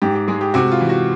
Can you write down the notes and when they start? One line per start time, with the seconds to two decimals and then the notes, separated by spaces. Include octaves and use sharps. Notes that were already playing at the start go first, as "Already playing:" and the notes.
0.02 G#2 G4
0.15 G4
0.28 G#3 G#4
0.41 G4
0.54 C3 F#4
0.72 F4
0.81 E3
0.89 F#4